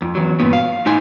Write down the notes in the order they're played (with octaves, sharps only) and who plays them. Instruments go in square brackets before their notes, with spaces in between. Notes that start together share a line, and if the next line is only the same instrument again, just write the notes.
[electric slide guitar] F2
E2 F#3
G2 A#2 F#3 B3
F5
A2 D#4 C5 G#5